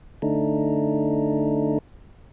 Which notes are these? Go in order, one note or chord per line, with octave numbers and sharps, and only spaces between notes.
D3 A3 D4 D#4